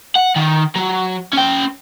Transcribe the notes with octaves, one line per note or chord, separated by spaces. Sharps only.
F#5
D#3
F#3
C#4 G5